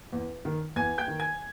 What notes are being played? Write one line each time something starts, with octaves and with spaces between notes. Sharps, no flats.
E2
D#3
E2 G#5 G#6
G5 G6
D#3
G#5 G#6